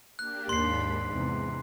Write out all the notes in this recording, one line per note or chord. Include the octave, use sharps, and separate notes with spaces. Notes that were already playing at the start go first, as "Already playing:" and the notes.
A#3 D4 G4 F#6
D#2 G#2 D4 B5 C6 C7
G#2
E2 C3